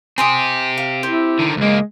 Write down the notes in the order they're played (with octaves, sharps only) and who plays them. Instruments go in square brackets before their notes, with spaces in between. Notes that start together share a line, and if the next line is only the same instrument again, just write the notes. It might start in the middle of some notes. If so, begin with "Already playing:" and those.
[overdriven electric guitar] C4 G4 [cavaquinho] G#5 C6 D#6
[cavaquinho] F5
[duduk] E4 [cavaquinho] C5
[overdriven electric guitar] D3 D#3
[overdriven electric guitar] C#2 A#3 [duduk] G#3